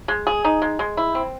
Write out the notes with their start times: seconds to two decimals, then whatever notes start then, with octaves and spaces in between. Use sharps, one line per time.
0.08 G#3
0.27 G#4
0.45 D#4
0.62 G#3
0.79 G#3
0.97 E4
1.15 C4